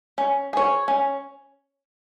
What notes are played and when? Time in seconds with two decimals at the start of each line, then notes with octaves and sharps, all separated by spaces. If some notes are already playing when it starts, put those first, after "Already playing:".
0.18 C#4
0.53 G#4 C#5
0.88 C#4